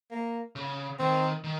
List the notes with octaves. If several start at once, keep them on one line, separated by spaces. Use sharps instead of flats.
A#3
C#3
D#3 C4
D#3